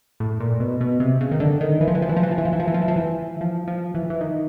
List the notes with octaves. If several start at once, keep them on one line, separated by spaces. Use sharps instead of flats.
A2
A#2
B2
B2
C3
C#3
D#3
D3
D#3
E3
F3
E3
F3
E3
F3
E3
F3
E3
F3
E3
F3
E3
F3
E3
F3
E3
F3
F3
E3
E3
D#3